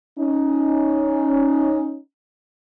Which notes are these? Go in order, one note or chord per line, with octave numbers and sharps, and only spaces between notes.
C#4 D#4